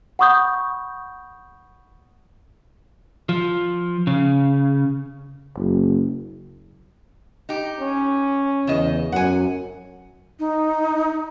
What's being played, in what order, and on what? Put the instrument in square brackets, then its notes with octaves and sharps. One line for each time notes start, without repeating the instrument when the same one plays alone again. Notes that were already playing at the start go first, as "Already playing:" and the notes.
[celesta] F#5 B5 C#6 D#6 G6
[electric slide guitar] F3
C#3
[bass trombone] F#1
[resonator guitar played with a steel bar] D#4 G4
[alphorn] C#4
[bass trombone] E2 [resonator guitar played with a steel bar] C#3 D#5
[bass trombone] F#2 [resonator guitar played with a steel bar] F#5 G#5
[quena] D#4